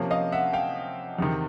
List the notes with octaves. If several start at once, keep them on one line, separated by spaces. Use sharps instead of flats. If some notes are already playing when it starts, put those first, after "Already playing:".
Already playing: C3 F3 A#3 C#4
D#5 F5
E5 F#5
F5 G5
E2 C3 D#3